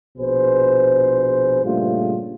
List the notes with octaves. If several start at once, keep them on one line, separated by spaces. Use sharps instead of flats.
A#1 B2 G#4 B4 C5
G2 A#2 C#3 G3 A3 F4